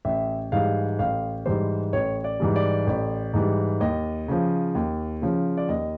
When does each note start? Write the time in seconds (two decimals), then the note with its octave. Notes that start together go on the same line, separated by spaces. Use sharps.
0.05 A1 E5
0.52 G#2 E3 G3 F5
0.99 A1 F5
1.46 G#2 E3 G3 C5
1.93 A1 C#5
2.24 D5
2.40 G#2 E3 G3
2.56 D5
2.87 A1
3.34 G#2 E3 G3
3.80 D#2 D#5
4.28 C#3 F3
4.75 D#2
5.22 C#3 F3
5.57 D5
5.69 D#2 D#5